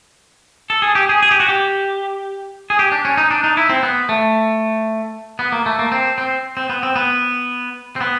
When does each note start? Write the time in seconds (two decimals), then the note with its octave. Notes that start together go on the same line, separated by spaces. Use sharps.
0.70 A4
0.82 G#4
0.95 G4
1.09 G#4
1.22 G#4
1.31 G4
1.40 F#4
1.49 G4
2.70 G#4
2.79 G4
2.92 D4
3.05 C#4
3.17 D#4
3.30 D4
3.44 D#4
3.57 E4
3.69 C4
3.83 B3
4.09 A3
5.39 B3
5.52 A#3
5.66 A3
5.79 A#3
5.92 C4
6.18 C4
6.57 C4
6.69 B3
6.83 C4
6.96 B3
7.96 C4
8.01 B3